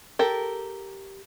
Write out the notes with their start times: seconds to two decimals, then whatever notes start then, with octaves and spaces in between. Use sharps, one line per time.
0.19 G4 A4 A#4